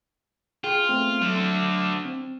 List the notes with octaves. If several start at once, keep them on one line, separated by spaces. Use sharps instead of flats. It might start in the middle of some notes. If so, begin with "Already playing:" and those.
F4 G#4 G5
A3 B3 C4
D3 F#3 A3
C4